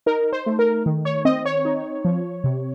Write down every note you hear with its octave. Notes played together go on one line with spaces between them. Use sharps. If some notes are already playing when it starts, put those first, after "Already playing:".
D#4 A#4
C5
A3
A#4
D#3
C#5
C4 D#5
C#5
D#4
F3
C3